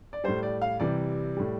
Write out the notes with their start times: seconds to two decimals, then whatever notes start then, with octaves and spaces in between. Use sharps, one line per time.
0.13 D5
0.24 A2 G3 C5
0.43 D5
0.62 F5
0.80 C3 E3 G3 D5
1.37 A2 G3